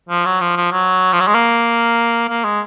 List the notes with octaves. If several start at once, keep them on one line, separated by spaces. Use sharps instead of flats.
F3
F#3
F3
F3
F#3
F3
F#3
G#3
A#3
A#3
G#3